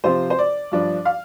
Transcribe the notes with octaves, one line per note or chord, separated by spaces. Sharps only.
C3 F3 C4 F4 C5
C5
D5
G2 F3 D4
F5